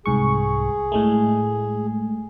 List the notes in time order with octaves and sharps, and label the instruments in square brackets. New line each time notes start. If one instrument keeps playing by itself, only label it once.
[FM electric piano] C2 G#2 C#6 [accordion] G#4
[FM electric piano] A2 G#3 A3